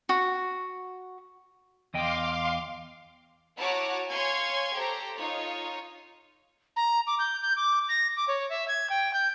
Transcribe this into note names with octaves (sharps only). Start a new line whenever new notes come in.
F#4
E2 D#5 F5 G5 C6 D6
E4 F#4 C#5 A5 A#5 D6
C#5 F5 G#5 C6 C#6 G#6
G4 A4 C5 A#5
D#4 F4 C#5
A#5
D6
G6
G6
D6
A#6
D6
C#5
E5
G#6
G5
G6